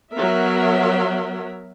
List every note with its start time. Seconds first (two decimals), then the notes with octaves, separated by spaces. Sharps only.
0.11 F#3 B3 A#4 E5